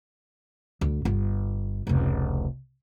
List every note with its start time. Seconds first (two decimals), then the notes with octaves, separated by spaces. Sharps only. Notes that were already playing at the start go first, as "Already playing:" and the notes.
0.81 D2
1.05 G1 F4
1.87 F1 C#2